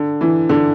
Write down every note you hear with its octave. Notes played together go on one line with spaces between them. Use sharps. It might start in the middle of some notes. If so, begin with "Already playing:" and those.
Already playing: D3
E3
D3